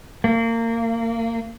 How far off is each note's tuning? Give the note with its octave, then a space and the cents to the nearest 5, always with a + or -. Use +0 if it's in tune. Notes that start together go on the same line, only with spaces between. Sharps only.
A#3 -30